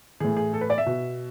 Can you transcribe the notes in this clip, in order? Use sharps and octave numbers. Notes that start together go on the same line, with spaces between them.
A2 E3 G#4
G#4
A4
B4
D5
E5
B2